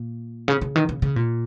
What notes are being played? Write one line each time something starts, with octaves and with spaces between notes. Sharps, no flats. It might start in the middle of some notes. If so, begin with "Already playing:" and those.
Already playing: A#2
C#3
C#3
D#3
C#3
C#3
A#2